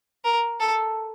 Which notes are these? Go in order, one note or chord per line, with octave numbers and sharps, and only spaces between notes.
A#4
A4